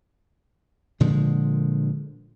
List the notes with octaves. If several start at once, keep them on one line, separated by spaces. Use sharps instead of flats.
A#2 D3 F3 G#3